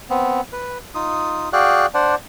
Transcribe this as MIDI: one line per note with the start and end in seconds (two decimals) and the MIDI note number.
0.10 0.41 59
0.10 0.41 60
0.53 0.78 71
0.95 1.49 63
0.95 1.49 65
0.95 1.49 87
1.53 1.86 66
1.53 1.86 68
1.53 1.86 74
1.53 1.86 77
1.53 1.86 79
1.53 1.86 90
1.94 2.15 62
1.94 2.15 72
1.94 2.15 74
1.94 2.15 78